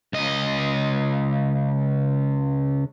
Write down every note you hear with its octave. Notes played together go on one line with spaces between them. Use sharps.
C#2 D#5